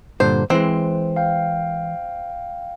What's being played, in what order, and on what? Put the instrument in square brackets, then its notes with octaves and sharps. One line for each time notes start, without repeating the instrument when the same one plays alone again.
[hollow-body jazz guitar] G2 A#2 D3 [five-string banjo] C5
[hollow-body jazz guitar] E3 G#3 [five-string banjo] C4
[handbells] F5 G5